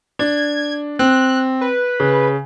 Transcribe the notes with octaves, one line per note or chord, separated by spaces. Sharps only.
D4 G#6
C4 F#6
B4
C#3